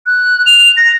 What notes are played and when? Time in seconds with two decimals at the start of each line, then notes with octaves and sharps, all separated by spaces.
0.06 F#6
0.46 F7
0.77 A#6